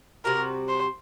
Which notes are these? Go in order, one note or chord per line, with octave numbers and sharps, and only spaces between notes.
C3 G3 C4 F#4 A#4
C5